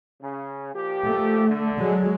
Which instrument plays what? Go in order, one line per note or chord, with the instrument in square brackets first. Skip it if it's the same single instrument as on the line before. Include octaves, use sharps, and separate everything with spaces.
[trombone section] C#3
A#2 F3 G4
[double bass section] A3
[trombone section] D3
[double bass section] F#3 G#3